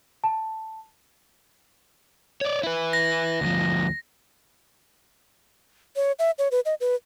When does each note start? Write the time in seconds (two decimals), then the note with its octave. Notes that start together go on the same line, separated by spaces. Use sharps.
0.24 A5
2.41 C#5 D5
2.63 E4 B4
2.93 A#6
3.41 D2 F3
5.96 C#5
6.19 E5
6.38 C#5
6.51 B4
6.65 D#5
6.80 B4